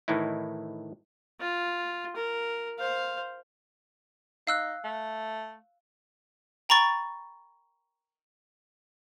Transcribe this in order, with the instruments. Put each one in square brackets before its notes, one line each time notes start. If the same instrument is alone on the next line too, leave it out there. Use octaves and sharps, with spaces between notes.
[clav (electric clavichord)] A2 D#3 E3 D#4 E4
[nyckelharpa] F4
A#4
C5 F5
[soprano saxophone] D#4 [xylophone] F5 E6 F#6
[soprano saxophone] A3
[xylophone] G5 A#5 B5 C#6 A6